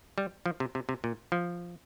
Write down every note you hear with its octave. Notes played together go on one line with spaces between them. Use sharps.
G3
F3
C3
C3
C3
A#2
F3